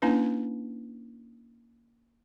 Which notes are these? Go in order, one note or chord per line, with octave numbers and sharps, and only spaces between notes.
A#3 C#4 D4 E4 B4